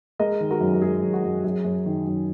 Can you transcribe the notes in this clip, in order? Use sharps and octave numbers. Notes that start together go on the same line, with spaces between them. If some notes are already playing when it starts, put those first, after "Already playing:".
G#3 A#4 D#5
D#3
F#4 A#4
F#2
A#4
G#3 G#4
F#2
F#4
F#2
F#2 G#4
F#2
D#3
F#2